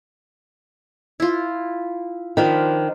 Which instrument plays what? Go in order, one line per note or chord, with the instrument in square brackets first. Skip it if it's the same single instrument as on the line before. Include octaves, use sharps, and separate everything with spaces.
[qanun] E4 F4
[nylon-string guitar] D#3 [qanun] F3 D4 B5